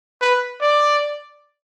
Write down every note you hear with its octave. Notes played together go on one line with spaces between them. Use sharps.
B4
D5